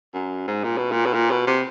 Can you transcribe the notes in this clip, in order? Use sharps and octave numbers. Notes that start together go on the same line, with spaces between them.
F#2
G#2
A#2
B2
A#2
B2
A#2
B2
C3